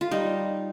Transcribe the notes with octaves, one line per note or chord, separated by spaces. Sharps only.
F4
G3 D#4